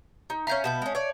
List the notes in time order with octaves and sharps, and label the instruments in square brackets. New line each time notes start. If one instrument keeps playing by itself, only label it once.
[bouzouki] D#4
[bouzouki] C#4 G#5 A#5 [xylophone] E5 F5 G6
[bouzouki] B2 B3 [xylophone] A5 G6
[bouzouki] G#3 C#4
C#5 D5